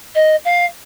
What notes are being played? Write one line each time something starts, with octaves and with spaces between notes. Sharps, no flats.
D#5
F5